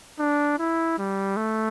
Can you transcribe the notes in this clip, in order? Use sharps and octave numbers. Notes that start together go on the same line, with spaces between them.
D4
E4
G3
A3